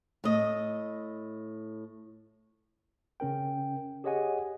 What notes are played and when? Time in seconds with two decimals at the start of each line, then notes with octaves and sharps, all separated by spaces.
0.24 A2 D#5
3.20 C#3 C#4 A#4 G5
4.04 G4 G#4 C#5 D#5 F#5 G#5